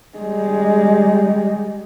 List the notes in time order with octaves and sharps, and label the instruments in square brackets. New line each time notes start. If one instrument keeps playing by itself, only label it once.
[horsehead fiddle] G3 G#3